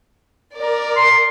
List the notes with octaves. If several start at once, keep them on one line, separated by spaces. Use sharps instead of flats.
A#4 D5
C6